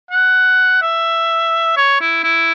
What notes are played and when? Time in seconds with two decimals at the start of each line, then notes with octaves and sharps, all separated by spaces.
0.11 F#5
0.82 E5
1.77 C#5
2.01 E4
2.24 E4